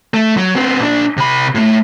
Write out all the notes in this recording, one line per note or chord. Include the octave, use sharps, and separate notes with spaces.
A3
F#3
B3 C4
A#2 D4
C3 B5
A2 A3